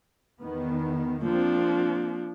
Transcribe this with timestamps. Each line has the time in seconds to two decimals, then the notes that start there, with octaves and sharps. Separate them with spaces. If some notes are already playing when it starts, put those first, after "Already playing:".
0.41 E2 D#3 B3
1.23 F3 A#3 C4 D4